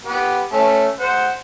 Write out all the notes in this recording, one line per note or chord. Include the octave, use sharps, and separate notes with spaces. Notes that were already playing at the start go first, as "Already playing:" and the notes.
B3 G4
A3 C#4
C5 F#5